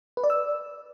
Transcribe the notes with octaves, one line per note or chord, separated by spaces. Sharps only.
B4
D5
E6